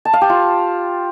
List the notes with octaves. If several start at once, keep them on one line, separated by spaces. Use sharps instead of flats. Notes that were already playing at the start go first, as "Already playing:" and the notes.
A5
F5
G4
F4